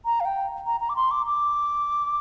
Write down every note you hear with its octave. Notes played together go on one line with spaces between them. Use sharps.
A#5
F5
G5
A#5
A#5
D6
C6
D6
D6